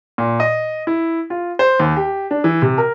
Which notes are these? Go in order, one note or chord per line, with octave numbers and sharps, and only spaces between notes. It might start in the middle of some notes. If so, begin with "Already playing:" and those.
A#2
D#5
E4
F4
C5
D#2
G4
D4
E3
C3
A#4